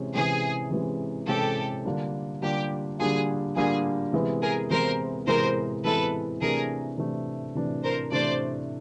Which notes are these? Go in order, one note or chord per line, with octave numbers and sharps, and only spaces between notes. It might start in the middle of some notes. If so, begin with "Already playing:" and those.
Already playing: C3 E3 G#3 C#4
C3 E3 G#3 C#4 G#4
C3 E3 G#3 C#4
C3 E3 G#3 C#4 G4 A4
D3 G3 A#3 D4 F4
D3 G3 A#3 D4 F4 G4
D3 G3 A#3 D4 F4 G#4
D3 G3 A#3 D4 F4 G#4
C3 E3 G#3 B3 E4
G#4 A#4
C3 E3 G#3 B3 E4 A#4 C5
C3 E3 G#3 B3 E4 A#4 C5
C3 E3 G#3 B3 E4 A4 B4
C3 E3 A3 D4 G#4 A#4
C3 E3 A3 D4
C3 E3 A3 D4
A#4 C5
C3 E3 A3 D4 C5 D5